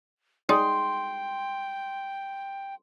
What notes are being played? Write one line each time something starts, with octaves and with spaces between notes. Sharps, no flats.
G#3 D#4 D5 G5 C6